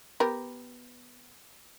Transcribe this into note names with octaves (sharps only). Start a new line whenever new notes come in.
B3 G4 A#4